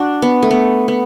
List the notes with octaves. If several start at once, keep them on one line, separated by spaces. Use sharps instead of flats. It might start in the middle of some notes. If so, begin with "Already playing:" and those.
Already playing: D4 F#4
B3
A3
B3
B3